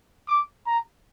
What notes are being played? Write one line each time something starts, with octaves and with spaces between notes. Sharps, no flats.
D6
A#5